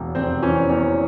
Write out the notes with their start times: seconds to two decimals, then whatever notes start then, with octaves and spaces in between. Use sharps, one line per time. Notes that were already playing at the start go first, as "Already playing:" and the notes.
Already playing: E1
0.15 F1 C4 C5
0.43 E3 C#4 C#5
0.69 E2 C#4 C#5